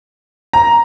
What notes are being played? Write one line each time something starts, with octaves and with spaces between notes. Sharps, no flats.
A#5